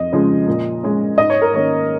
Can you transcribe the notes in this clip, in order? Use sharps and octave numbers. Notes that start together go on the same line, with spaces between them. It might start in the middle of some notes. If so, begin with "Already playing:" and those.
Already playing: F2 D#5
C#3 F3 G#3 C#4
A#2
G#3 C#4
G#2 D#5
C#5
A#4
D#3 A#3 C#4 C#5